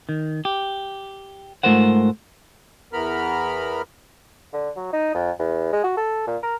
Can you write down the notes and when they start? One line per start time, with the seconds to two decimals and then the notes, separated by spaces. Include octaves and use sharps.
0.09 D#3
0.45 G4
1.63 G#2 A3 F4 A#4 C5 F#5
2.93 E2 E3 B3 A#4 B5 F6
4.53 D3
4.76 F#3
4.93 D#4
5.14 F2
5.39 E2
5.72 G#3
5.84 F#4
5.97 A4
6.27 A#2
6.43 A#4